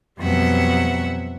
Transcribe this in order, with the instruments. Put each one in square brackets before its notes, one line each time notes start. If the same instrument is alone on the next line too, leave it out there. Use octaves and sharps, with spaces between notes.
[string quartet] F2 B2 F#3 G3 E5 F#5